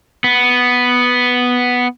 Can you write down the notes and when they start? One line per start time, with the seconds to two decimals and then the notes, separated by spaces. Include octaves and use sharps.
0.24 B3